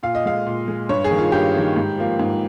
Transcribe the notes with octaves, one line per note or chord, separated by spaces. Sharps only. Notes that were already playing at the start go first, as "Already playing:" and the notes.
A#2 F5
D#5
G#3 F5
A#2
G#3
G2 C#5
G#4
D#3 A#3
F4
G2 G4
D#3 A#3
G#2
F3 A#3
G#2